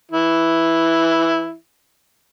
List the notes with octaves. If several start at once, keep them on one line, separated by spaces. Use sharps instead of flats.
E3 E4